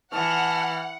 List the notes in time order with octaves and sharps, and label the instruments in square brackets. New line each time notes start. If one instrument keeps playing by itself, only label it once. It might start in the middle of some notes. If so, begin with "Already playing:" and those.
[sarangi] E3 [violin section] F#5 [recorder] A5 [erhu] F6